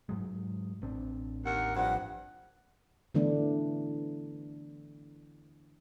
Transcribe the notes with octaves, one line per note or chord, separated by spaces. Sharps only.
G#2 F#3 G#3
A1 C4 D4
D#2 A#4 F#5
G2 F3 F#5
D3 E3 A3 B3 D4